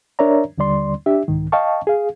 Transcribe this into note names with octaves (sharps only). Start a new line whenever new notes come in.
D4 A#4 C#5 D5 E5 A#5
D#2 D3 G3 D5 C6
D4 G4 E5
C2 G#2 D#3
D#5 F5 G5 A5 C#6
G#4 F5